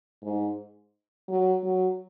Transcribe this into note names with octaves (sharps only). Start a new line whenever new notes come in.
G#2
F#3
F#3